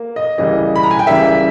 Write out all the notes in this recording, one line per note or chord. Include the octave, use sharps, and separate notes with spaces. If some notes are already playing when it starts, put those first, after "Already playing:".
Already playing: A#3
D#5
C#2 C#3 E3 G3 A#3 D#5
B5
A#5
G#5
G5
C#2 C#3 E3 G3 A#3 E5